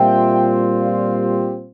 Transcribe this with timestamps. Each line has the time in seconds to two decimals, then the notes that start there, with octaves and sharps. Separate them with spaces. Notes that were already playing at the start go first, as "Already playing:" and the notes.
Already playing: A#2 G3 C4 F4 E5 G5
0.81 D5 F5
1.19 G4